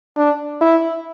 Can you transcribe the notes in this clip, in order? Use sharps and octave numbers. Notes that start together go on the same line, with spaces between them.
D4
E4